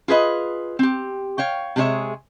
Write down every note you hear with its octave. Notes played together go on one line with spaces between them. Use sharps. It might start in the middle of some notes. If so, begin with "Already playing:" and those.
F4 G#4 B4 D#5
C4 G4
C#5 F5 G5
C3 G#3 G#4 C#5 E5